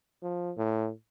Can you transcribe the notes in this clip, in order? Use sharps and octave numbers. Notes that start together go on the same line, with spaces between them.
F3
A2